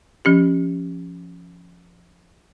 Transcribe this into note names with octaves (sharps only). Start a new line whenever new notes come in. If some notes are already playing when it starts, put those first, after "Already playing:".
F3 C#4 G4